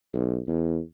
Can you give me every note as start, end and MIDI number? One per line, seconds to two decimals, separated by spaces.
0.14 0.39 35
0.47 0.80 40